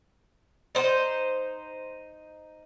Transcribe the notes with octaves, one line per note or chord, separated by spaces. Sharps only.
D#4 C5